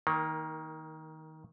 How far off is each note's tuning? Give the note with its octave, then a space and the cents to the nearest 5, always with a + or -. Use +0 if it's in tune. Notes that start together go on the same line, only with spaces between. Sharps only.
D#3 +20 A#3 +0